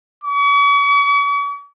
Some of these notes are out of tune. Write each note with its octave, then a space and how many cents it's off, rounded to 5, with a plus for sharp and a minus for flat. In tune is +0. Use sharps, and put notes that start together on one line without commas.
C#6 +45